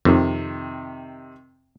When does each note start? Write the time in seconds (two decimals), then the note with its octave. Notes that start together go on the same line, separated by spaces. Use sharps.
0.05 F2 C3 D#3